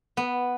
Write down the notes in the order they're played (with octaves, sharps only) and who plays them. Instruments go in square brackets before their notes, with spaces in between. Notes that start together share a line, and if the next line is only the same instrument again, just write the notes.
[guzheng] B3